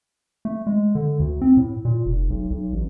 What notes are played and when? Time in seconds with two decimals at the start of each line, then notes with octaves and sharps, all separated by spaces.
0.45 A3
0.67 G#3
0.95 D3
1.20 D2
1.41 C4
1.57 A2
1.85 A#2
2.06 F1
2.30 B1
2.50 B1
2.73 A1